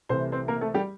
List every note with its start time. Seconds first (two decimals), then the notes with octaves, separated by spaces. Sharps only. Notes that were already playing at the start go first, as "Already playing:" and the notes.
0.09 C2 C3 E3 A3 C5
0.32 C4 C5
0.48 A#3 A#4
0.61 A3 A4
0.74 G3 G4